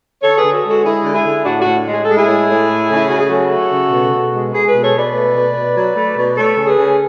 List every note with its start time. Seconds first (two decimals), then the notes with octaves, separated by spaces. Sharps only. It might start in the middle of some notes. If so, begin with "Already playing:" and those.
0.22 D3 A4 C#5
0.37 G#4 B4
0.43 D3
0.53 F#4 A4
0.64 G#3 F#4 A4
0.84 G#3 E4 G#4
1.04 D3
1.14 E4 G#4
1.25 D3
1.45 A2 D4 F#4
1.61 A2 D4 F#4
1.86 G#3
1.91 G#4
2.05 G#3 A4
2.17 E4 G#4
2.27 A2
2.48 A2
2.68 A3
2.89 C#3
2.97 E4
3.08 C#3 F#4
3.18 G#4
3.30 F#3 F#4 A4
3.50 A3
3.71 C#3
3.91 B2
4.12 B2
4.32 G#3
4.52 G#3 G#4 B4
4.67 G#4 B4
4.73 B2
4.83 A4 C#5
4.93 B2 B4 D5
5.14 A3
5.35 B2
5.55 B2
5.75 F#3
5.95 A3
6.16 B2
6.36 A3 A4 C#5
6.57 C#3
6.67 G#4 B4
6.78 C#3